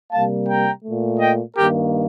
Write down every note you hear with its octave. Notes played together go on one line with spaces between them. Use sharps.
C3 G3 A#3 F5 A5
G5 A#5
A#2 A3
D#5 G5
G2 D#3 A#3 G4 A#4